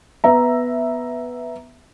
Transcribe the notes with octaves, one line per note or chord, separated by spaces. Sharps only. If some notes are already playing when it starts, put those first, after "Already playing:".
B3 E5 A#5